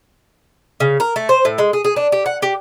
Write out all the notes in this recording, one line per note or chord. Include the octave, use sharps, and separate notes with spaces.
C#3
A#4
A3
C5
A2
G#3
G#4
G#4
D4
G4
F#5
G4